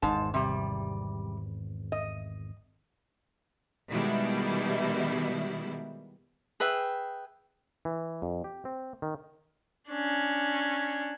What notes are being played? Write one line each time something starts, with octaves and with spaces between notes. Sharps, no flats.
G#1 E2 G#2 A5
C3 G3
D#5
B2 D#3 G3 G#3 E4
G#4 B4 E5 G5
E3
F2
G4
C4
D#3
C#4 D4